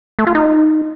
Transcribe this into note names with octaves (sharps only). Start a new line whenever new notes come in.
A3
F4
D#4